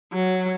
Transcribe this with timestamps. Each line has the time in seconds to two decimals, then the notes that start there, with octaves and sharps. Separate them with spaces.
0.13 F#3